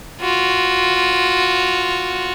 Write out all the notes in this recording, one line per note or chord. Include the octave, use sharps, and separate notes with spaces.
F4 F#4